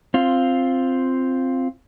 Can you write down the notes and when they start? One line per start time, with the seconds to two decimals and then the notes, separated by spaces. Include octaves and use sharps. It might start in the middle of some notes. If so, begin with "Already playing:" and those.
0.14 C4 F4